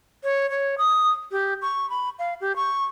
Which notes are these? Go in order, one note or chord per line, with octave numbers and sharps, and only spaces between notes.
C#5
C#5
D#6
G4
C#6
B5
F5
G4
C#6